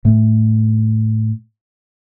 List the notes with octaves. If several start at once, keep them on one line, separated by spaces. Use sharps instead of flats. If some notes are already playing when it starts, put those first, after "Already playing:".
A2 A3